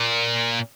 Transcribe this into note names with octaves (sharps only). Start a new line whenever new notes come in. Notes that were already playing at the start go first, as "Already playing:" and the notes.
Already playing: A#2